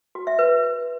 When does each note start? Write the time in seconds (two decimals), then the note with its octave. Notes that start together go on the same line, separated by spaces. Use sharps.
0.15 F#4
0.27 E5
0.39 B4